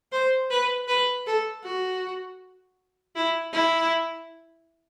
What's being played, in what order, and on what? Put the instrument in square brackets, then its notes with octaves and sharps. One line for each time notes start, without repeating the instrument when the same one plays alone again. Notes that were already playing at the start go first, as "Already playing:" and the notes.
[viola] C5
B4
B4
A4
F#4
E4
E4